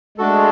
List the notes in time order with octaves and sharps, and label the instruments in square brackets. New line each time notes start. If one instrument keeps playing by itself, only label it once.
[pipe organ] G#3 [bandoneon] A3 D4 F#4 A4